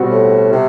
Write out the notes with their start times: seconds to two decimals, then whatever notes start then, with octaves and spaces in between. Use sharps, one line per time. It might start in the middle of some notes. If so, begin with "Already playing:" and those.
Already playing: B2 G3 C4 F#4
0.10 A2
0.52 C3